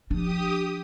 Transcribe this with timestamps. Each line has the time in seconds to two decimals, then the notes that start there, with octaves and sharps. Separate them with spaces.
0.10 F3 D4 G4 D#6